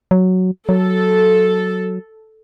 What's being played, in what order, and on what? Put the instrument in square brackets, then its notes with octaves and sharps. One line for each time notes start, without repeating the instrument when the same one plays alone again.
[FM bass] F#3
[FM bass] F#3 [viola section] A4